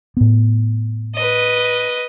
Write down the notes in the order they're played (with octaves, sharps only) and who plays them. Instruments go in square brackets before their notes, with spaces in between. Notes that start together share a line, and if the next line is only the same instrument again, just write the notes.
[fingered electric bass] A2 B3
[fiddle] B4 D#5